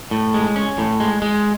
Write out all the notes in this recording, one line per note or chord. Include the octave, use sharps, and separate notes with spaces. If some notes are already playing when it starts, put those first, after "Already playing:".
A2
G#3
C#4
A2
G#3
G#3